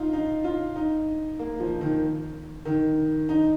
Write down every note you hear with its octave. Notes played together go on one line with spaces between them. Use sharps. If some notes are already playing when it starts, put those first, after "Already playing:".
Already playing: D#4 F4
D#4
F4
D#4
A#3
F3
D#3
D#3
D#4